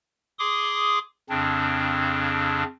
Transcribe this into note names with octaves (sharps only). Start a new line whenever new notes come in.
G#4 C6 D6 D#6
F2 C#3 C4 D4